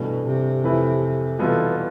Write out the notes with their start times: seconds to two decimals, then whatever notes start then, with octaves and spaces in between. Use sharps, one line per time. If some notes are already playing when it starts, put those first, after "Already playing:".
Already playing: G2 B2 E3 A3
0.26 C3
0.64 F2 E3 A3 E4 B4
1.39 B2 E3 G3 B3 F4 A4